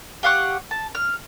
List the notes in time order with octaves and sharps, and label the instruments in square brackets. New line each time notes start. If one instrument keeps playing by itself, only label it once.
[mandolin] G4 F5 F#5 C#6
A5
F6